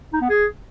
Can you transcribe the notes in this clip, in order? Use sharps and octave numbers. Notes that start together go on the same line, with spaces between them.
D#4
B3
G#4